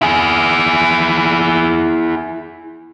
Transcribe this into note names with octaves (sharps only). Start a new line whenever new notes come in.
E4 G#4